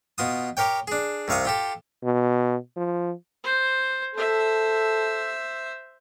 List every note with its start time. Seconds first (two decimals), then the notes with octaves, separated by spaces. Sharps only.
0.18 B2 F4 D#6
0.57 G4 A#4 C#5 G5
0.88 D4 G#4
1.28 C2 C3 F5 C#6 D#6
1.45 F4 G4 A4
2.04 B2
2.77 F3
3.44 C5
4.15 A4 C5 E5